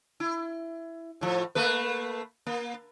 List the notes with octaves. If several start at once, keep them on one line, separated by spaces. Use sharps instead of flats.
E4
A2 F3
A3 A#3 B4
A#3